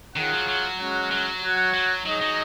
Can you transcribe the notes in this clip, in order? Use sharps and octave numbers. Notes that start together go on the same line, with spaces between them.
D#3 F4 G#4 C#5 F#5
F#3
F#3
G#3 C#4 F#4 C#5 F#5
F#3
F#4 C#5 F#5
F#3
F#3 D#4 G#4 D#5
F#3